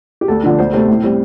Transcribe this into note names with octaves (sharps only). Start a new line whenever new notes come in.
G4
D2 A4
D3 F3 D4
D2 C5
C3 A3 C5
A2
G3 C4